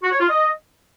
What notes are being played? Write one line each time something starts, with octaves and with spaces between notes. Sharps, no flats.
F#4
C#5
F4
D#5